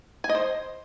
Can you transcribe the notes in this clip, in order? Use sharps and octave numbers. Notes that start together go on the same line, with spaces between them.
G#5
D#5
C5